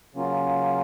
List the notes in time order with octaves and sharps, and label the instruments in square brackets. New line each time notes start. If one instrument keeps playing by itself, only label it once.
[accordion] C#3 F#3 A#3 C#4 F4